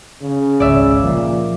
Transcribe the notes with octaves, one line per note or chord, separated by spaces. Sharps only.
C#3
G#1 C#2 D5 E5
A#2 F3